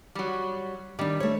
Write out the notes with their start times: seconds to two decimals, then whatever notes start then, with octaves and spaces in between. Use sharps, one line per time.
0.15 F#3 G3
0.99 D#3 G3 D4
1.20 A3 C#5